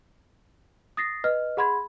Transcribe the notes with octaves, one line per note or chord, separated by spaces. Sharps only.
D#6 A6 A#6 C7
B4 D#5 F6
G#4 F#5 B5 C6 G#6